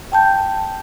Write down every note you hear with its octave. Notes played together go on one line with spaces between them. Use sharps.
G5 A5 G6